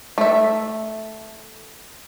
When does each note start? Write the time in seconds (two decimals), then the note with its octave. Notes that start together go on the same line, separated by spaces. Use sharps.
0.18 A3 E5